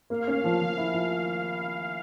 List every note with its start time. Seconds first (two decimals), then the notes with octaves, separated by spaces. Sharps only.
0.10 A#3 F5
0.27 C#4
0.44 F3
0.61 F3
0.78 E4
0.94 F3